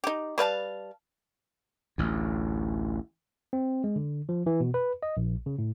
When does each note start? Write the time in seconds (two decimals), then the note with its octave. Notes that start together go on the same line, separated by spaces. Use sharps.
0.04 D#4 G4
0.38 G3 B4 F5 A5
1.98 A1 D2
3.53 C4
3.84 G#3
3.96 D3
4.29 F3
4.46 E3
4.60 B2
4.74 B4
5.03 D#5
5.17 A#1
5.46 C#3
5.58 A2